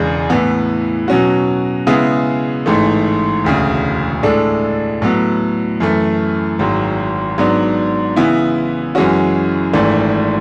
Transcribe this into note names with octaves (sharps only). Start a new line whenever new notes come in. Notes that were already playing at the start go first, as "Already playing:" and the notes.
Already playing: E1 E2 C#3 G#3 D4
A2 E3 B3
B2 F#3 C#4 F#4
C#3 G#3 B3 E4 G#4
A1 G#2 E3 A3
E1 D2 C#3
A2 G#3 D4 A4
A2 F#3 B3
F#2 E3 A3
G#1 G#2 F#3
G#2 F#3 B3 D4
C#3 E3 B3 E4
F#2 E3 G#3 C#4 F#4
G#1 G#2 E3 A3 D4